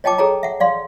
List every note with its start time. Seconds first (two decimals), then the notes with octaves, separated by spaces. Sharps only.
0.04 C#5 D#5 G5 A5 D6
0.18 G#4 A4 C#5 G5 A#5
0.43 E5 F#5
0.60 D5 F5 C6